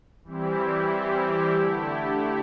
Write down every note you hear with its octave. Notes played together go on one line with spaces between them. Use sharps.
E3 G3 C4 E4 G4
D3 A3 E4 G4